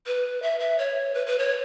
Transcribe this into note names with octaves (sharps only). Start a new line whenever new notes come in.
B4
E5
E5
C#5
B4
B4
C#5